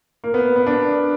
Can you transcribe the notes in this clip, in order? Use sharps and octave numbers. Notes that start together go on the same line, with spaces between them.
A#3
B3
B3
D4